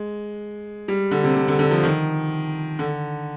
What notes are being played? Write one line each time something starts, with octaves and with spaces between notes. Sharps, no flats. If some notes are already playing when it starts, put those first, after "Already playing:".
Already playing: G#3
G3
D3
C3
C3
D3
D3
F3
D#3
D3